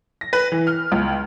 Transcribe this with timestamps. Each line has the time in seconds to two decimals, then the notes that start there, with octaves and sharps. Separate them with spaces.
0.21 A#6
0.33 B4
0.52 E3
0.67 F6
0.92 C#2